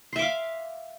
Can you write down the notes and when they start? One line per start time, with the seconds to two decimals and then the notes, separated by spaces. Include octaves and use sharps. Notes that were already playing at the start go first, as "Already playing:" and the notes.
0.13 C6
0.16 E5
0.19 D6
0.22 F5